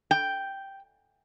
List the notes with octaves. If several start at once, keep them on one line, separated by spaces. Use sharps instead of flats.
G5